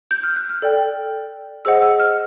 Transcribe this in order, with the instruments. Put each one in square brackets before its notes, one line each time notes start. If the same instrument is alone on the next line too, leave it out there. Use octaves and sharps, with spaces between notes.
[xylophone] G6
F6
F#6
F6
A4 D5 G5
G#4 C5 D#5 F#5 E6
E6
F6